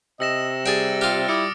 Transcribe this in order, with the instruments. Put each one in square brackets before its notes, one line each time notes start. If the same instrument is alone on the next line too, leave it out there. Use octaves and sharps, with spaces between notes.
[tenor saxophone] C3 [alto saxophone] D#5 [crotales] E6 A#6 E7
[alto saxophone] G3 [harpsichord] G#4 G5 [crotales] A6 D7
[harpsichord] F4 G4 [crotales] F6
[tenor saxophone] E4 [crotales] D6 D#6 C#7